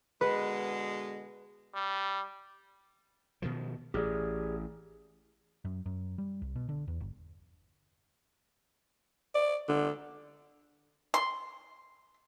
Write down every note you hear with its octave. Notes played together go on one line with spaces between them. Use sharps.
B2 D3 G#3 B4
G3
B2 D#3 F3
A1 G4 G#4 D5
F#2
F#2
G3
C2
B2
D3
E2
G1
D5
D3
C6